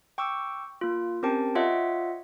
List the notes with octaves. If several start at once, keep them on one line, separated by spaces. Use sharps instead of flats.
G5 C#6 D6 E6
A#3 F4
C4 C#4 G4 A#4 G5 A5
F4 C#5 D#5 E5 F#5